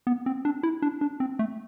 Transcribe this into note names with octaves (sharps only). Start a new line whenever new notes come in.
B3
C4
D4
E4
D4
D4
C4
A3